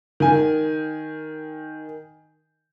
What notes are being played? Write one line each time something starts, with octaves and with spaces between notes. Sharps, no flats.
D#3 G#5